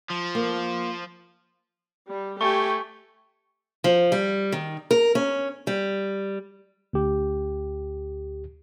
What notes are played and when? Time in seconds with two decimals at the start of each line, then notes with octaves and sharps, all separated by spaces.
0.10 F3
0.35 A#3
2.08 G3
2.41 A3 G4 G5 G#5 C#6
3.84 F3
4.12 G3
4.52 D#3
4.91 A#4
5.15 C#4
5.67 G3
6.93 D2 G4